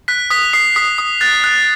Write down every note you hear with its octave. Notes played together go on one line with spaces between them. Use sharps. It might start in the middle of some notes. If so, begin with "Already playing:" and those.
F#6 B6
D#6 B6
D#6 C7
D#6 B6
D#6
F#6 A6
F#6